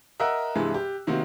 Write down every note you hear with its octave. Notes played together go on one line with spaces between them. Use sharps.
A#4 D#5 E5 F#5 E6 F#6
G2 C3 E3 G#3
G4
C3 D#3 A#3 C4 F#4